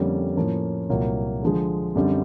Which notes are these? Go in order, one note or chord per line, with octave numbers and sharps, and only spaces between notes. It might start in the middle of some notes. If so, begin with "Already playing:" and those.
Already playing: F2 D3 G3 A#3 C#4
A2 F3 A#3 C#4
C2 A#2 F#3 A#3
D3 F3 G#3
F#2 D3 G3 C4